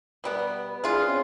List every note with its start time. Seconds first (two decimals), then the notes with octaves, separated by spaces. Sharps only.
0.24 B2 G3 B3
0.69 B4
0.84 D4 F4 G#4 F6
1.06 C4 C#4 C5